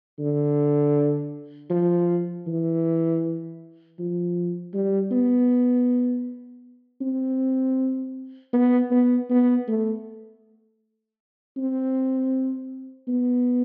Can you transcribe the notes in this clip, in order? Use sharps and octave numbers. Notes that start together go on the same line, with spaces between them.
D3
F3
E3
F3
G3
B3
C4
B3
B3
B3
A3
C4
B3